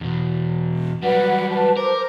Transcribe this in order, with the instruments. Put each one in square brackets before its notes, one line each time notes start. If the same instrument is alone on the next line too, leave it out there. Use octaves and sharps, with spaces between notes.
[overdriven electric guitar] E2 B2
[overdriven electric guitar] F#3 G3 [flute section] B4 F#5
[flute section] B4 A5
[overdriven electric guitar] A#4 [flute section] C5 D6